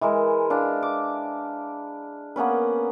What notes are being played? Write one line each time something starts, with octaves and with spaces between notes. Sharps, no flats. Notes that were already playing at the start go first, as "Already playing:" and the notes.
E3 G#3 A#4
D4 F5
D6
A#3 B3 C#4 B4